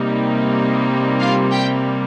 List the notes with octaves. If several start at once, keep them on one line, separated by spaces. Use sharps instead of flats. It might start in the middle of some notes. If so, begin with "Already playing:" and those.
Already playing: C3 G3 A#3 D#4
F4 F5
G4 G5